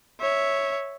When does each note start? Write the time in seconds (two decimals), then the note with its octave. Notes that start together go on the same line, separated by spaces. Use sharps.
0.21 C#5 E5